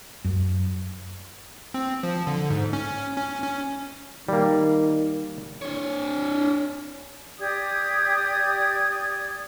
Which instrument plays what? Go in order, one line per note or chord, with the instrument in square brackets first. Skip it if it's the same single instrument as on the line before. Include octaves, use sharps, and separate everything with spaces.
[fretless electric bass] F#2
[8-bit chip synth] C4
F3
D3
G#2
C#4
C#4
C#4
[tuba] D#3 [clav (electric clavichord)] G3 A#3
[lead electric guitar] D4 C#5
[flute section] G4 D5 D#6 G#6